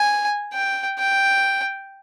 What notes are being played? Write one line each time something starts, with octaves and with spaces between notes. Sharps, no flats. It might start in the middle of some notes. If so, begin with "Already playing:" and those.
Already playing: G#5
G5
G5